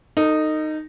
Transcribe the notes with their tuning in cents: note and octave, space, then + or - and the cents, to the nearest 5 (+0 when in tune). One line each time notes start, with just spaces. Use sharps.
D#4 -10 A4 +30